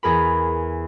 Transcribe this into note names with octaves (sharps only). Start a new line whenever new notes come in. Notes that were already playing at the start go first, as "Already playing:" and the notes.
E2 G#4 A#4 B5